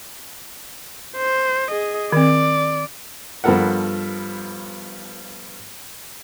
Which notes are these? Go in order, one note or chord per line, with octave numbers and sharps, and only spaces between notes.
C5
G#4 D#5
D#3 C4 D5
G2 F3 B3 A4 A#4 F#5